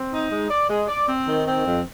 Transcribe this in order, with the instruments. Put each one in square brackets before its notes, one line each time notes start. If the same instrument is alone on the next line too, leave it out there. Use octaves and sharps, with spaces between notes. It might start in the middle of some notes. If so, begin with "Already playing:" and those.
Already playing: [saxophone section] C4
D#4
G#3
D5
G#3
D5
C4
D#3
C4
F2